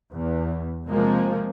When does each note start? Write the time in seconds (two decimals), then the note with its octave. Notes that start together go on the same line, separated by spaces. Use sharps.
0.11 E2
0.89 C3 F3 G#3 A#3